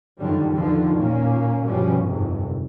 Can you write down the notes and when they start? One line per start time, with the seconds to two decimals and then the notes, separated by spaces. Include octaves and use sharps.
0.18 F#2 D3 D#3 F3 G3
0.53 E2 D3 D#3 F3
0.99 A#2 A#3 C#4
1.67 G1 B2 F3 G3 C#4
2.02 G1 C2 F2 G#2 C3